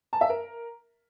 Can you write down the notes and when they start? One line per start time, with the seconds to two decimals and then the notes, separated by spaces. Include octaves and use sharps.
0.13 A5
0.21 E5
0.29 A#4